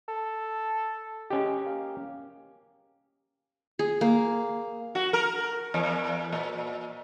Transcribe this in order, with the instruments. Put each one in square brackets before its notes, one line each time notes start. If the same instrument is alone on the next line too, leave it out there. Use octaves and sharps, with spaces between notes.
[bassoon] A4
[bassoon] G#3 [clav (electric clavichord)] C#4 G4
[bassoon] A#3
[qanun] G#4
A#3
[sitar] F#4
A#4
E2
A#2